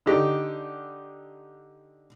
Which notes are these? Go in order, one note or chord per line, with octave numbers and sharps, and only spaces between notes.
D3 D#4 G4